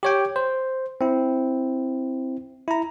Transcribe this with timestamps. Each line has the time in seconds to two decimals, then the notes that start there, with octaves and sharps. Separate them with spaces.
0.03 G4 C#5 G5
0.36 C5
1.01 C4 E4
2.68 E4 A#5